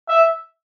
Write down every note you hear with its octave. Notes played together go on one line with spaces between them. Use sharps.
E5